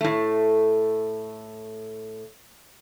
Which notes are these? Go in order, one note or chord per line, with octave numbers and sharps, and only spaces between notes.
A2 A3